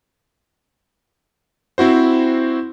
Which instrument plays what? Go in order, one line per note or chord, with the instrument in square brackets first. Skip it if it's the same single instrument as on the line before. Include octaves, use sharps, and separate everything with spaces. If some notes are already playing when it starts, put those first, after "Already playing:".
[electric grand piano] C4 E4 F#4 C5